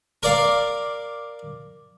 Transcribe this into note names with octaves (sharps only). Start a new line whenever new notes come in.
A#4 D5 F5